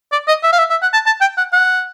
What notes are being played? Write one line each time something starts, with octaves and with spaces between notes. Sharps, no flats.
D5
D#5
E5
F5
E5
E5
F#5
A5
A5
G5
F#5
F#5